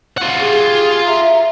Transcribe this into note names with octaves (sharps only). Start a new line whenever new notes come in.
F4 F#5
G4 G#4
E5 A#5